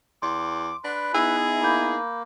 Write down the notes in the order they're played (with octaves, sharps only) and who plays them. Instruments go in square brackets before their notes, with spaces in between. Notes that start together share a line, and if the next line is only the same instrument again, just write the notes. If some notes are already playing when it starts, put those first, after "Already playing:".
[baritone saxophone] E2 [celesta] C6 [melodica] D6
[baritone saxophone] D4 [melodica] B4 B5
[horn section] B3 D#4 E4 [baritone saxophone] G#4 [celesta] E6
[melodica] A#3 [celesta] B5 G6